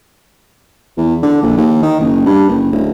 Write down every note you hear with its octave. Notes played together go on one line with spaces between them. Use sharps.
E2
D3
A#1
D#2
D#3
F#1
G2
F#1
D1